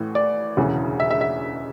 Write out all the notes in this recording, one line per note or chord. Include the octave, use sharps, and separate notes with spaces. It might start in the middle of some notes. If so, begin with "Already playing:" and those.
Already playing: A1 A2 E3
D5
E1 D2 C#3 E3
E5
E5
E5